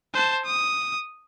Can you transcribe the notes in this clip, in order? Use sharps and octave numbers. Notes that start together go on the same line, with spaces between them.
C5 A5
D#6